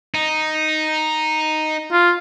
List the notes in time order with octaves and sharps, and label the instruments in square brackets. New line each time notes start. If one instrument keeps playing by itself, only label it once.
[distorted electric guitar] D#4
[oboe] F4